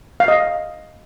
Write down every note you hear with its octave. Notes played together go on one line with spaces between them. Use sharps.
F5
D#5